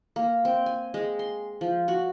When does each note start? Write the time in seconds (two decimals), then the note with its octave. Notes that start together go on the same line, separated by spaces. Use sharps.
0.16 A#3
0.45 C4
0.66 G#5
0.94 G#3
1.19 C6
1.61 F3
1.88 F#4